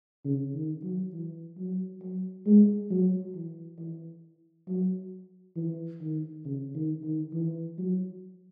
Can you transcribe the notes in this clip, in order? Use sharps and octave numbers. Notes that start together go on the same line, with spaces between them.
C#3
D#3
F#3
E3
F#3
F#3
G#3
F#3
E3
E3
F#3
E3
D#3
C#3
D#3
D#3
E3
F#3